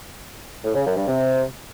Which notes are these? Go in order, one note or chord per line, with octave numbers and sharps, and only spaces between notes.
A2
C#3
F#2
G2
C3